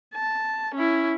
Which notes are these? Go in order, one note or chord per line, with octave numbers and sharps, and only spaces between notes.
A5
C#4 E4